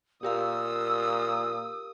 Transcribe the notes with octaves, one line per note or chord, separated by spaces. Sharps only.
A#2 G4 A#4 F5 D#6 E6